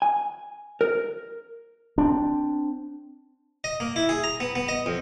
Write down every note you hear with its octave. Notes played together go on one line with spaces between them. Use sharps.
G#5
A#4
C4 D4
D#5
A#3
E4
G#4
A#5
B3
B3
D#5
F2